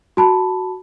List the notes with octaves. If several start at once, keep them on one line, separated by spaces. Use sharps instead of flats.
F#4 A5 B5